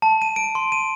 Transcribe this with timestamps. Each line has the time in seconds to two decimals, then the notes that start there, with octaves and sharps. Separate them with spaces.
0.02 A5
0.22 D#7
0.36 D7
0.55 C6
0.72 D#7